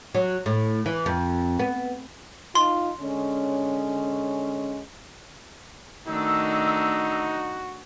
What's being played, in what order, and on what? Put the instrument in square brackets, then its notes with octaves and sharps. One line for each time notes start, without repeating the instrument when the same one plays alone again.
[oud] F#3
A2
E3
F2
B3
[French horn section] D#4 F4 [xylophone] C6
[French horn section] D3 G#3 C#4
[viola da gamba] D#3 A3 D4 [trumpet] D#4 [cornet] F#4 [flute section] E6